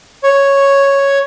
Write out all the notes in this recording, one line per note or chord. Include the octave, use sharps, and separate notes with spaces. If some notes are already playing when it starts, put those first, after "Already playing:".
C#5